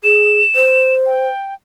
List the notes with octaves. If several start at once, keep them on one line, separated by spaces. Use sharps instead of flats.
G#4 E7
C5
G5